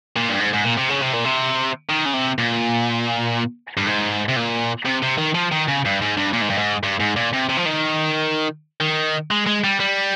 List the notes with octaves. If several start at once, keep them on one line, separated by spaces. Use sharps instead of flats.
A#2
G2
G#2
G#2
A#2
C3
C#3
C3
A#2
C3
D#3
C#3
C3
A#2
G2
G#2
C3
A#2
C3
C3
D#3
F3
D#3
C#3
G2
G#2
G2
A#2
G#2
G2
G#2
G2
G#2
A#2
C3
C3
F3
D#3
D#3
G#3
G#3
G3
G3